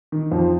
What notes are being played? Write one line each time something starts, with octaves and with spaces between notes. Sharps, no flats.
D#3
F2 F3